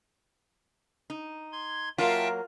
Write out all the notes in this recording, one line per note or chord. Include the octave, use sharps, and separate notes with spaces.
D#4
C6 G#6
F#3 A#3 F4 A#4 E5 G5 A5